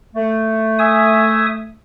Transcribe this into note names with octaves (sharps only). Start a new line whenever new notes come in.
A3
E5 G#5 D#6